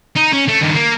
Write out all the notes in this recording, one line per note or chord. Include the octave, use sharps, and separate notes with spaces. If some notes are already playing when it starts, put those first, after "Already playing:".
D#4
C#4
A3
G2 D#3
A#3